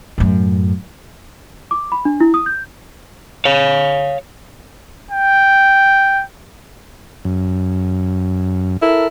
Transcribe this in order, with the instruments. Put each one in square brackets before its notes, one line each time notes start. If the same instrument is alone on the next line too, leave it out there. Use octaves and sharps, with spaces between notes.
[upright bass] F#2 A2
[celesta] D6
B5
D4
E4
D#6
G6
[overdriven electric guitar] C#5 F5
[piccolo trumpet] G5
[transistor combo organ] F#2
[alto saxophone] E4 [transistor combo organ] A4 A#4